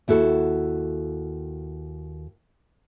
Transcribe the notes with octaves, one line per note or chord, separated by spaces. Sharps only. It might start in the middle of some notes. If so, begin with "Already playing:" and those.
D#2 E4 F#4 A4